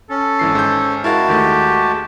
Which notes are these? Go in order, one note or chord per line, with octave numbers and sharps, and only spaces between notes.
C#4 A4
G#1 E3 C7
G#2 G6
G#3 E4 F#4 A#4 F5 A5
D#2 D#3 A3 G4